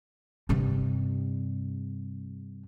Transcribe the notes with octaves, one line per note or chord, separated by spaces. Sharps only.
G2 C3